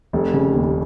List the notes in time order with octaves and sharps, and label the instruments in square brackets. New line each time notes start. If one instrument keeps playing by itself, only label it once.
[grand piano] F1
C#3
D#2